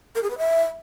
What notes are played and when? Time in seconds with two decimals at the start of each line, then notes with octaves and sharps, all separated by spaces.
0.15 A#4
0.23 G#4
0.30 B4
0.38 E5